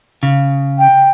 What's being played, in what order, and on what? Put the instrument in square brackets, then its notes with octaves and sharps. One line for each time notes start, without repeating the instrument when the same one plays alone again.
[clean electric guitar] C#3
[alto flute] G5